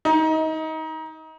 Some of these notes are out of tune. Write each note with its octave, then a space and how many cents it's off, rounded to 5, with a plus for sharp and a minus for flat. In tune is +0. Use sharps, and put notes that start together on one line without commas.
D#4 +25